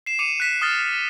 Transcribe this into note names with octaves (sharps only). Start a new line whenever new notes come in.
C7 E7
D6 C#7 D#7 F7
F#6 B6 E7
D#6 F6 A6